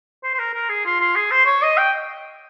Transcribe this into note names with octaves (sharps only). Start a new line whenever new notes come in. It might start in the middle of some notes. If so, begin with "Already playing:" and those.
C5
C5
A#4
A#4
G#4
F4
F4
G#4
C5
C#5
D#5
G5